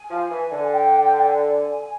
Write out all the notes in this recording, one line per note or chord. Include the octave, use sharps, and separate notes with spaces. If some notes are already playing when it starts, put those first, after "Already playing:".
Already playing: G#5
F3
E3
D3
G5
G5
G5
G#5